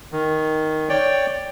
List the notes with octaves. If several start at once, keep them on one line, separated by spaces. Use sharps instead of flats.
D#3
C#5 D5 G5